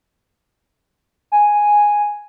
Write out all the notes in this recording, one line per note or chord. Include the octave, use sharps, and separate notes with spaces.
G#5